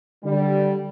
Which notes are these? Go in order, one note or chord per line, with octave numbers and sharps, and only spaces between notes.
D3 G3